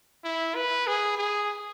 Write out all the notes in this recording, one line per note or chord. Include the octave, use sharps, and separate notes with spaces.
E4
B4
G#4
G#4